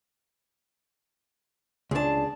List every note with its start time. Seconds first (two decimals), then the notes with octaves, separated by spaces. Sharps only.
1.91 C#2 D4 G#4 A5